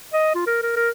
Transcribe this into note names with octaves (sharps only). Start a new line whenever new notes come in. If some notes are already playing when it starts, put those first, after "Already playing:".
D#5
F4
A#4
A#4
A#4